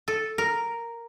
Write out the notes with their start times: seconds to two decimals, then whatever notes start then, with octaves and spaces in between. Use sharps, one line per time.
0.08 A4
0.38 A#4